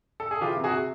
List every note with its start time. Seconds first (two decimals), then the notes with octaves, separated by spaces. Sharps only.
0.20 A4
0.31 G#4
0.41 E3 F4 G4
0.57 C3
0.64 F#4 G#4
0.72 C3